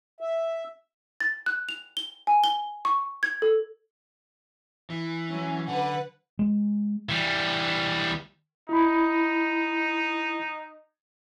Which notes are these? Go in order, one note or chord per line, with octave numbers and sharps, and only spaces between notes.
E5
A6
F#6
F7
G7
G#5
G7
C#6
G#6
A4
E3
F#3 C#4
D3 B4 F#5
G#3
E3 G3
D#4 E4 B5